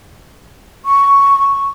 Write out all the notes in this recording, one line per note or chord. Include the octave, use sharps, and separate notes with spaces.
C#6